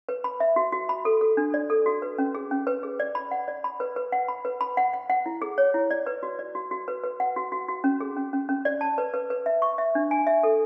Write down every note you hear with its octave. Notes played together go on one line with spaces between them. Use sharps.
B4
B5
E5
F#4
F#4
B5
A4
A4
D4
D5
A4
F#4
B4
C#4
G#4
C#4
B4
G#4
D5
B5
F#5
D5
B5
B4
B4
F#5
B5
B4
B5
F#5
F#5
F#5
E4
G#4
C#5
E4
D5
B4
F#4
D5
F#4
F#4
B4
B4
F#5
F#4
F#4
F#4
C#4
G#4
C#4
C#4
C#4
D5
A5
B4
B4
B4
E5
C#6
E5
D4
G#5
E5
A4